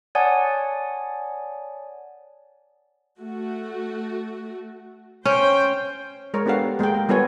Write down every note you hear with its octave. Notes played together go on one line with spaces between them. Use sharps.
C#5 D5 F#5 G#5 A5 D#6
A3 F#4
C#4 C5 G5
G#3 A#4 C#5
B3 D4 G4 A4 F5 F#5
G#3 A#3 A#4 G5
A#4
G3 B3 F4 A4 C#5 G#5